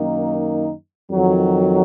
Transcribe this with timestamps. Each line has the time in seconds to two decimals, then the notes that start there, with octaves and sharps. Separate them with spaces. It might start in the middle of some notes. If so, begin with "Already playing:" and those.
Already playing: F#2 D#3 A#3 D#4
1.10 F2 D#3 F#3